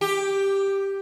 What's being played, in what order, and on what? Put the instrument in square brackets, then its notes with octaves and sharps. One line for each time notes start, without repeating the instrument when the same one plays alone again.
[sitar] G4